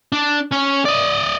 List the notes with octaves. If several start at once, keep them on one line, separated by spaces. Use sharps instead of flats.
D4
C#4 C#5
D5 D#5